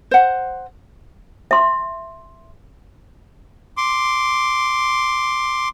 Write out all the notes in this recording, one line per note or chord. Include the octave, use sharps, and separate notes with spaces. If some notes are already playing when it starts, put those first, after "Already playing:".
C5 F#5
E5 C6
C6 D6